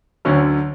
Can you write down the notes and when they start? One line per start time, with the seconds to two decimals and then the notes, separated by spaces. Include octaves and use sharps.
0.25 D2 D3 F#3 C#4